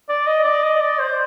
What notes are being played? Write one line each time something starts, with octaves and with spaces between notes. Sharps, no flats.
D5
D#5
D5
D#5
D5
C5